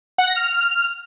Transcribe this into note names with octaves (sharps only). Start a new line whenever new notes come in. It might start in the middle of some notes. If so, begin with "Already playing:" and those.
F#5
A#6
F6